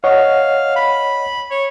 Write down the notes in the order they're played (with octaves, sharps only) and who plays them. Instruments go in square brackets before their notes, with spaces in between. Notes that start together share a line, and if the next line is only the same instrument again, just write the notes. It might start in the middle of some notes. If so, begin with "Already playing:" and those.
[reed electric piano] C#5 D#5 F#5 [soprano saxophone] F5
[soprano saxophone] B5
C#5